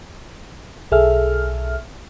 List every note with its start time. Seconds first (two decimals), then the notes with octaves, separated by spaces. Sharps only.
0.92 B1 G#4 A4 E5 F6